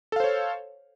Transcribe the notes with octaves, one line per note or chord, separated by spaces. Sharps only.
A4 C5 C#5 F5